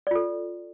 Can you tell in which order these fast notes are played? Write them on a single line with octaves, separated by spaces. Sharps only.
D5 F4 A4